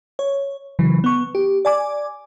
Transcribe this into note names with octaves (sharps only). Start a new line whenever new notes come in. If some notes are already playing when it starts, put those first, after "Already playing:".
C#5
C#3 E3 F#3
B3 C#6
G4
D5 G#5 D6